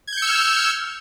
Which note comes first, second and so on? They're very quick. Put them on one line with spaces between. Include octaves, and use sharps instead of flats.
G#6 G6 C#7 E6 F6